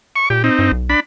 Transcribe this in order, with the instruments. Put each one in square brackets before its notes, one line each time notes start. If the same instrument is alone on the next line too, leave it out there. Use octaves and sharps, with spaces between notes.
[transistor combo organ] C#6
[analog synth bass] A#2 [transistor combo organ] G4
[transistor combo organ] C4 D#4
[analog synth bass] G2
B1
[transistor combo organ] D4 B5